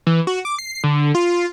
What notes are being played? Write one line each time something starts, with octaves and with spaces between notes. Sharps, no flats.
E3
F#4
D6
C7
D3
F4